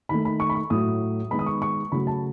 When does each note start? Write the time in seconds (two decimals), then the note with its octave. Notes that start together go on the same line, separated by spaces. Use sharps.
0.09 D#3 A3 B5
0.25 B5
0.40 C#6
0.50 B5
0.55 C#6
0.70 A2 F#3 A3 D#6
1.31 D#3 G#3 B3 B5
1.39 D#6
1.46 C#6
1.62 C#6
1.92 C#3 F#3 A3 B5
2.07 A5